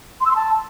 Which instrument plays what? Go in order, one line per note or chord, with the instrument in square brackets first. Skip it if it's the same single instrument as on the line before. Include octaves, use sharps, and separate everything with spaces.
[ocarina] C6
E6
C6
A5